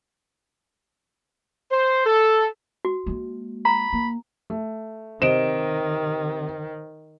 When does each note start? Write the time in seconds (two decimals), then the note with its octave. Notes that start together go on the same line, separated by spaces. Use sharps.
1.71 C5
2.06 A4
2.85 F#4
3.06 G#3 A#3
3.65 A#5 B5
3.93 A#3
4.50 A3
5.22 C3 D#3 C5 D#5 D7 E7